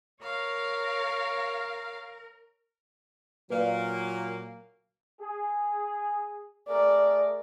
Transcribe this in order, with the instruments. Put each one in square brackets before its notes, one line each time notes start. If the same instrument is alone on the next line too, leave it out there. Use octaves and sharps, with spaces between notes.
[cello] A#4 [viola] C#5 [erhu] F5
[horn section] A#2 F#3 A#3 [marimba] B4 D5 F5
[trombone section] G#4
[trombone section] A3 G#4 A#4 [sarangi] D5